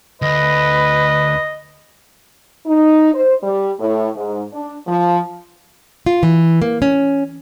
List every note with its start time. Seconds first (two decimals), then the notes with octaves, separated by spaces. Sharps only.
0.22 D2 B4 D#5
2.66 D#4
3.14 C5
3.42 G3
3.79 A2
4.15 G#2
4.52 D4
4.87 F3
6.06 F4
6.23 E3
6.62 A#3
6.82 C#4